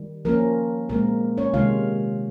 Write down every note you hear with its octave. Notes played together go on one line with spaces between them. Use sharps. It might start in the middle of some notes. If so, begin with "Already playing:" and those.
Already playing: D#3 G3
F3 A#3 C#4 A#4
A#2 G#3 A#3 C4 A#4
C#4 C#5
C3 D#3 G#3 F4 F5